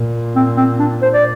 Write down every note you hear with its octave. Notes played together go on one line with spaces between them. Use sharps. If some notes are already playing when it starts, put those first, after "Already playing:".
Already playing: A#2
C4
C4
D4
C5
D5